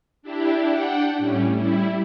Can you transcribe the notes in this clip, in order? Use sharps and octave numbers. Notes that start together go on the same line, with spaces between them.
D4 E4 G4
D4 F#5 G5
A2 G3 C#4
G3 E4